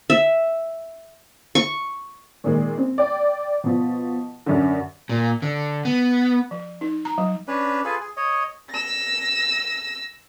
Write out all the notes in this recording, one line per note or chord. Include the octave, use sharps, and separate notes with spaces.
E5
C#6
A#2 D#3 G#3
C4
D5 G5
B2 F3
F#2 D3
A#2
D3
B3
F3
D#4
A#5
F#3
C#4 D4 B4
F4 G#4 A4 B4
G#4
C#5 D#5
E6 A#6